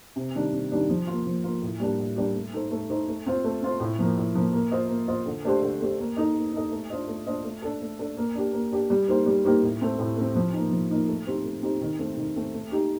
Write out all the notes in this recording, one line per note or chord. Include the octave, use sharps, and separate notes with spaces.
C3
D#3 G3 D4
C3
D#3 G3 D4
F3
A#3 F4
F3
A#3 F4
A2
G3 A#3 D4 G4
A2
G3 A#3 D4 G4
A3
D#4 A4 C5
A3
D#4 A4 C5
A3
C4 F4 C5
A3
C4 F4 C5
A2
F3 A#3
A2
F3 A#3
A#3
F4 C5 D#5
A#3
F4 C5 D#5
D3
A3 D4 G4 C5
D3
A3 D4 G4 C5
A#3
D#4 A4 D#5
A#3
D#4 A4 D#5
A3
D4 F4 C5 D#5
A3
D4 F4 C5 D#5
A3
D4 A4
A3
D4 A4
A#3
D4 G4
A#3
D4 G4
G3
A#3 D#4 G4 C5
G3
A#3 D#4 G4 C5
A2
A3 C4
A2
A3 C4
F3
A#3 D#4
F3
A#3 D#4
A3
C4 D#4 G4 C5
A3
C4 D#4 G4 C5
D#3
A3 C4
D#3
A3 C4
A3
D#4 G4